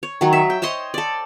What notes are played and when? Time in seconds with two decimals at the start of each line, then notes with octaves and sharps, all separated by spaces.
0.03 C#5
0.21 D#3 F#3
0.33 E5
0.50 G5
0.62 C5 C#5 D#5 C6
0.94 A4 D5